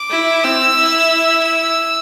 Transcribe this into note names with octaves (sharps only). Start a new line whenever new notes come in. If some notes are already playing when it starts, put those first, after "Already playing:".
Already playing: D6
E4
C4 E6
E4
E6